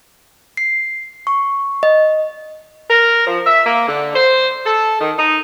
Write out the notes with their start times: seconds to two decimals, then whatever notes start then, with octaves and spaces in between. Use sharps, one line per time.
0.57 C7
1.27 C#6
1.83 D#5
2.90 A#4
3.27 F3
3.46 E5
3.66 A#3
3.89 D3
4.15 C5
4.66 A4
5.01 D#3
5.18 D#4